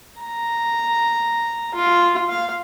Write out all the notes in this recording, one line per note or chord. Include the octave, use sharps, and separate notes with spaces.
A#5
F4
F5